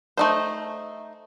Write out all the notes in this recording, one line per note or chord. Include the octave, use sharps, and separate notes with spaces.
A3 D#4 C5